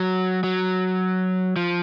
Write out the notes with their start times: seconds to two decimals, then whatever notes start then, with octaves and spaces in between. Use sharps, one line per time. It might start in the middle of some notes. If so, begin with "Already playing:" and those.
Already playing: F#3
0.44 F#3
1.56 F3